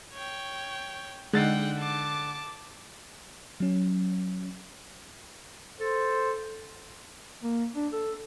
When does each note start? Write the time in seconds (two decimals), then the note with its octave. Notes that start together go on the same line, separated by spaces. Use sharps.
0.13 C#5 G5
1.33 D3 G#3 D#4 F#5 G5 A6 C7
1.79 A5 D6
3.60 F#3 C#4
5.80 A4 C5
7.43 A#3
7.76 D4
7.93 A4